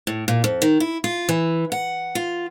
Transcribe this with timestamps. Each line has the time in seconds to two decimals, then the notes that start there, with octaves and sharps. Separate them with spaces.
0.07 A2
0.28 A#2
0.44 F2
0.62 D#3
0.80 E4
1.04 F4
1.29 E3
1.72 F#5
2.15 F4